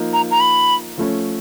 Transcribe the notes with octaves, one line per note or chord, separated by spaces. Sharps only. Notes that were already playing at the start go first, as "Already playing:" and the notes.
Already playing: F3 A#3 D#4
A#5
A#5
B5
F3 A3 C#4